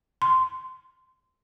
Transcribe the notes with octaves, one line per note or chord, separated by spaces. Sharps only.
C6